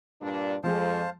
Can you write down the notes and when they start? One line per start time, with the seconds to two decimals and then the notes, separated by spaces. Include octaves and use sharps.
0.21 G2 A#2 D4
0.64 F2 F3 G#3 C5 F5 A5